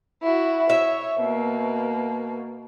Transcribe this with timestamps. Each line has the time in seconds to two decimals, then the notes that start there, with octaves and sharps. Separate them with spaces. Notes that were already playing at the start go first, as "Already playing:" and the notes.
0.22 E4 F#4
0.70 C#5 E5
1.21 B2 A#3